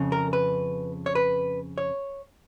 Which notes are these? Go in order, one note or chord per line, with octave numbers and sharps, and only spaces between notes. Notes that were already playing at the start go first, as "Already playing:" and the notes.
Already playing: F2 C#3
A#4
B4
C#5
B4
C#5